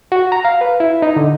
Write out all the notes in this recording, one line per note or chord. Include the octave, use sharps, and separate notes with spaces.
F#4
A#5
F5
B4
E4
D#4
D3